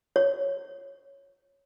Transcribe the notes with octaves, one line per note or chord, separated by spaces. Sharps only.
C#5